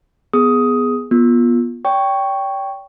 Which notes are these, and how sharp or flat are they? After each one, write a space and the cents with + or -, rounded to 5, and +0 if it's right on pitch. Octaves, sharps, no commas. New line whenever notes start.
B3 +0 G#4 +0 D#6 +10
B3 -30 F4 +0
D5 -45 G5 +0 C#6 +0